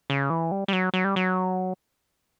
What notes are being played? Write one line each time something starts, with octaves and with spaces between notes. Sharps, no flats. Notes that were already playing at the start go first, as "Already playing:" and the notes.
C#3
E3
G3
G3
F#3
F#3
G3
F#3